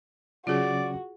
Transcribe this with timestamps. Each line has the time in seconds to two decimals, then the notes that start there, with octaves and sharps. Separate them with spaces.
0.47 C#3 F#3 C#4 F4 F#4 G#4 D5